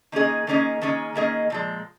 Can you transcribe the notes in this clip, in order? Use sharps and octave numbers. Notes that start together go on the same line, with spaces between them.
D#3 A#3 C#4 G#4 D#5
D#3 A#3 C#4 G#4 D#5
D#3 A#3 C#4 G#4 D#5
D#3 A#3 C#4 G#4 D#5
A#2 F3 G#3